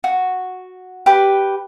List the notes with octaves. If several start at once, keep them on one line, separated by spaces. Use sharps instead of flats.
F#4
G4 B4